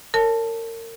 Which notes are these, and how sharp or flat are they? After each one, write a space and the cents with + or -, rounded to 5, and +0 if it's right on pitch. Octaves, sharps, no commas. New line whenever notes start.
A#4 -30 C#5 +0 A5 +0